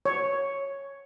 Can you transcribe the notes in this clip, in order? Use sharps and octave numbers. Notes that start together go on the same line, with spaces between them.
C#5